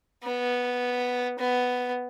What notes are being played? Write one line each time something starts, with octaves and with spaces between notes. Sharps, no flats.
B3
B3